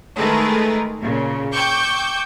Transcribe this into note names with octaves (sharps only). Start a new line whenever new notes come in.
D#3 G#3 A3 G#4 A#4 B4
A#2 C#3
G5 C#6 D6 E6 G6